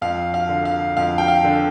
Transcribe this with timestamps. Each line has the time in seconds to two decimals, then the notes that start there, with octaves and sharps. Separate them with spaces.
0.01 F2 F5
0.34 F5
0.49 D3
0.65 F5
0.97 F2 F5
1.18 G5
1.28 F5
1.44 D3